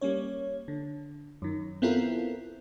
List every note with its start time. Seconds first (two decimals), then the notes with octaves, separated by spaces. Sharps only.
0.01 G3 A#3 C#4 C#5
0.68 D3
1.42 F#2 D#3
1.82 B3 C4 E4 F4 A4 A#4